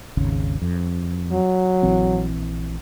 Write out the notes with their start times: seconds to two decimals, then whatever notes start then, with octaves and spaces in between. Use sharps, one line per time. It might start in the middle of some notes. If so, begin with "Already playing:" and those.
0.17 G#1 D#2 C#3
0.62 F2
1.32 F#3
1.83 A#1 E3 C4